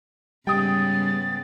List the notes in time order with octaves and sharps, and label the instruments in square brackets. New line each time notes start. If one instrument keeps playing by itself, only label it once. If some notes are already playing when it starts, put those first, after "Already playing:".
[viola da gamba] G#2 C#3 B3 [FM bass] G3 [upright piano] G5 D#6 [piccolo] A6